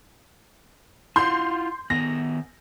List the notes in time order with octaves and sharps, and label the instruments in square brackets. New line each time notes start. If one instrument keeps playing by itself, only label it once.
[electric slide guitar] E4 F4 F#5 [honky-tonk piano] C6 G6
[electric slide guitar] D#3 B3 G#5 [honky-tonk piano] A#6